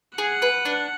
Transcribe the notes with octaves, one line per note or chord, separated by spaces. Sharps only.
G#4 F#5
B4
D4